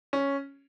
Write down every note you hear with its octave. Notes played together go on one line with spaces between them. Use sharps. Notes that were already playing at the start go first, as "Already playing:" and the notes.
C#4